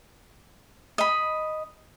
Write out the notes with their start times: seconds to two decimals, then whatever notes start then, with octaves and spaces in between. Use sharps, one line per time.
0.98 D#5 B5